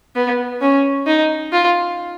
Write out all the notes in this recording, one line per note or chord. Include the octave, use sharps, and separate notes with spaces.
B3
C#4
D#4
F4